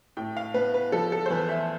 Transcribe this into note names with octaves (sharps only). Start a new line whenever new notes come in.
A2 G5
F5
B3 B4
B4
F3 A4
A4
C5
E2 B4
E5